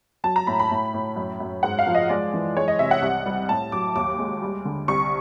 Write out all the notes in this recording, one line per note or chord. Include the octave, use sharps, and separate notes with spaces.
F#3 A5
A#5
A2 B5
B5
A2
A2
F#2
F#2
G#2 F#5
F5
F3
D#5
G#3 D5
E3
G#3 C#5
D#5
C3 E5
F#5
C2
G3
A2 A5
F#3 D6
D#2 D6
G#3
G3
D3
C2 C#6